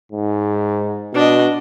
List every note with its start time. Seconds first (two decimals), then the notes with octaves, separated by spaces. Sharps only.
0.12 G#2
1.14 B2 D4 D#5